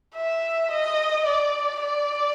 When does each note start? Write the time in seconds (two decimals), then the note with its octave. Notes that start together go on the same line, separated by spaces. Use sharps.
0.16 E5
0.71 D#5
1.26 D5
1.80 D5